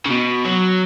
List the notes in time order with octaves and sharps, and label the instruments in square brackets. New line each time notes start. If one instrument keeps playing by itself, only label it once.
[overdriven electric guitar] C#3
B2
F#3